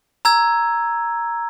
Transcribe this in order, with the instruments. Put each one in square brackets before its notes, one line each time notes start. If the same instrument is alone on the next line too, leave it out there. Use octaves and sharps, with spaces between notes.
[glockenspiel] A#5 E6 G#6